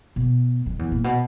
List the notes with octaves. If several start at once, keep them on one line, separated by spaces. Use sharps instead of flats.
B2
F2
E2
A#2
B2